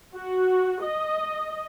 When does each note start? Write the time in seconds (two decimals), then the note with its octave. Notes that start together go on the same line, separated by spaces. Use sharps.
0.14 F#4
0.82 D#5